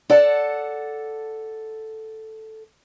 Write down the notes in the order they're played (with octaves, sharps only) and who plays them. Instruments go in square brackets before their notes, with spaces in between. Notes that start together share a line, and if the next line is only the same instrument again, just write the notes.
[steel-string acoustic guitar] A4 D5 F#5 A5